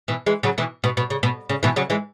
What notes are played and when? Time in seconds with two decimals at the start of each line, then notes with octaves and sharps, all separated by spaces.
0.08 B2 E3
0.26 E3 G#3
0.43 C#3 F#3
0.58 B2 E3
0.84 B2
0.97 B2
1.10 C#3
1.23 B2
1.49 C#3
1.63 B2 E3
1.76 C#3 F#3
1.90 E3 G#3